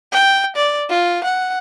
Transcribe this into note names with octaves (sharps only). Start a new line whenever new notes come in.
G5
D5
F4
F#5